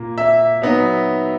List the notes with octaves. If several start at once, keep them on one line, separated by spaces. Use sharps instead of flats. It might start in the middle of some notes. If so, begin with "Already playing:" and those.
Already playing: A#2 A#3
E5
F#3 B3 D#4